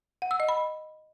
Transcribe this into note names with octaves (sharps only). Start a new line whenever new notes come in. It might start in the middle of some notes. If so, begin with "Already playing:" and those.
F#5
E6
D#5
B5